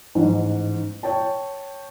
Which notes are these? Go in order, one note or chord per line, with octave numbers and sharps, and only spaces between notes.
A1 G#2
C#5 G5 A5